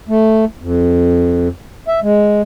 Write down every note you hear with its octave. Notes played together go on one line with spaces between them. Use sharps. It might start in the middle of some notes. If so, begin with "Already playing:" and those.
A3
F2
E5
G#3